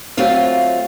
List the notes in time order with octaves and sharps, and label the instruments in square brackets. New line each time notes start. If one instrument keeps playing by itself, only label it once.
[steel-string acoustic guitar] F#3 A3 C4 F4 F5